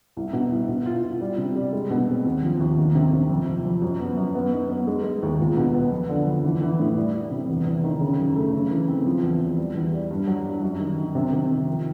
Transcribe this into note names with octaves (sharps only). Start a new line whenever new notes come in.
C2
B2
C2
B2
F4
F4
G3
C3
G3
G#3
B2
C4
D#2
F3
D#2
D#3
C3
C3
F2
F3
F2
F#2
B3
F#2
B3
D#4
B3
G#3
G#3
D#2
C#2
B2
B3
F2
D3
F2
E3
E3
A2
G3
G3
C3
E2
E2
D#3
C#3
F#2
A3
C#3
E3
C4
F3
E2
E2
G3
E2
G3
G2
F#3
G2
F#2
D#3
D#3
C3
C3
D#3
F3